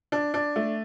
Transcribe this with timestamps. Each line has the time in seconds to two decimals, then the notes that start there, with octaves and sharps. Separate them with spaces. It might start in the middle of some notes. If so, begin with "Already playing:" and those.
0.12 D4
0.34 D4
0.56 A3